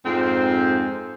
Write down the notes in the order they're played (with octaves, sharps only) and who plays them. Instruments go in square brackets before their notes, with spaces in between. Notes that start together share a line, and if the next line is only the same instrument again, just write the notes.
[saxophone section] F2 G#2 C4